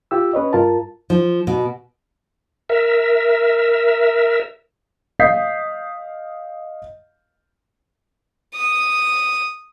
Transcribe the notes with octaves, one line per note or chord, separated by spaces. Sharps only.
F4 G4 E6
C#4 B4 C#5 D#5
G2 F4 A#4 A5
F3
B2
A#4 E5
D#5 F5 D#6 G6 B6 C7
D#6